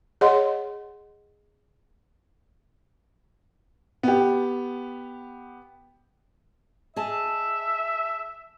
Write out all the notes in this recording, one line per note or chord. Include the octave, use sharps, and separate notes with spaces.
G#4 C#5 D#5 F#5 C6
B3 G4
G#4 D#5 E5 A5